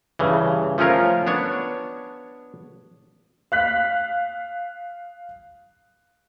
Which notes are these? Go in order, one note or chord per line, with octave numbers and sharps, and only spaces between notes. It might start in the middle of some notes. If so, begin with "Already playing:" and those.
G2 C#3 E3
F3 A3 C#4 F4 A#4 C#5
B3 D4 C#5
F5 F#6 B6